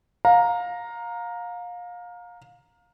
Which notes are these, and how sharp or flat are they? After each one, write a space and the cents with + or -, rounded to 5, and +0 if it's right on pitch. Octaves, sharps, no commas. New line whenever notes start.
F5 +25 A#5 +0